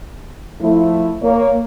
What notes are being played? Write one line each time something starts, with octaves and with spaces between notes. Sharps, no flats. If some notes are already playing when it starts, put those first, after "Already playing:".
F3 A3 E4
A#3 C#5